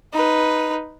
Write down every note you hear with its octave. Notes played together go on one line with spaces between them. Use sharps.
D#4 B4